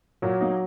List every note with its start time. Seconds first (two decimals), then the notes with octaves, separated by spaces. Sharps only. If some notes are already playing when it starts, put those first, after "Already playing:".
0.22 A#2 F#3
0.40 A#3 D#4